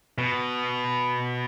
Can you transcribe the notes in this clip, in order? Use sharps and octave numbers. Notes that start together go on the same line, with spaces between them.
B2